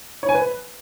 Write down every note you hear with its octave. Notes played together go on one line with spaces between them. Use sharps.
C#5
G#5
B4